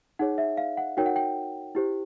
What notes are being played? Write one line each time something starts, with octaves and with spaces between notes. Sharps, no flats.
D#4 G#4 C#5 F#5
E5
F5
F#5
D#4 F#4 A#4 C#5 G5
F#5
G5
E4 G4 C5